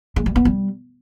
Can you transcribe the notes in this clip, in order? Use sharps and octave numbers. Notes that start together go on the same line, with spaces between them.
G#3
G3
B3
G3